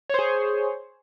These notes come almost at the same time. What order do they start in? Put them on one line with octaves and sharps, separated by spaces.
C#5 C5 G#4